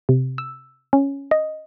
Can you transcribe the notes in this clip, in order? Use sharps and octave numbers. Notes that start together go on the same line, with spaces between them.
C3
E6
C#4
D#5